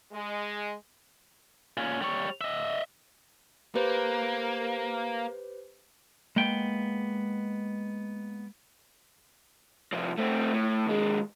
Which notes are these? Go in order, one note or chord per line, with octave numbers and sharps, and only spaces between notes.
G#3
A#2 C#4
G3 C#5
D#5 E5
A#3 G4 B4 C5
G#3 A#3 B3 G5
C2 F3
A3 C4
A2
D#2 G#3